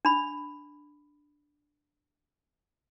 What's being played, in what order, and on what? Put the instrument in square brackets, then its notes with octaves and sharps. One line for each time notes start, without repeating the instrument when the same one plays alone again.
[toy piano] D4 B5